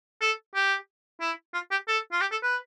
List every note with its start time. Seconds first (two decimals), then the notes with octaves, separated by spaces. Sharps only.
0.21 A4
0.55 G4
1.21 E4
1.54 F4
1.71 G4
1.88 A4
2.12 F4
2.21 G4
2.32 A4
2.43 B4